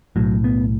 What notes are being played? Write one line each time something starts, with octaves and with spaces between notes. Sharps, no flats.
B1 A2 F#3
B3